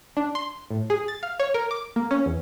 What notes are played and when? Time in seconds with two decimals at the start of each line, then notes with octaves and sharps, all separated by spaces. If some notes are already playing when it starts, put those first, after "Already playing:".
0.17 D4
0.35 C6
0.70 A2
0.90 G#4
1.08 A6
1.23 F5
1.40 C#5
1.54 A#4
1.71 D6
1.96 A#3
2.11 C#4
2.26 E2